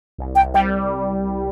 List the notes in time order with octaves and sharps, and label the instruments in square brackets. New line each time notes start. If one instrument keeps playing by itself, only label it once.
[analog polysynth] C2
[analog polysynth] C2 [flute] G5
[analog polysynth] G3 [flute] G5